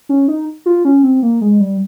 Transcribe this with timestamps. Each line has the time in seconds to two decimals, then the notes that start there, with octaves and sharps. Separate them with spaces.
0.09 C#4
0.28 D#4
0.66 F4
0.85 C#4
1.03 C4
1.23 A#3
1.41 G#3
1.60 G3